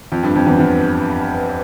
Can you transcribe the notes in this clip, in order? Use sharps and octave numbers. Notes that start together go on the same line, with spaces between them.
F2
G2
F2
E2
E2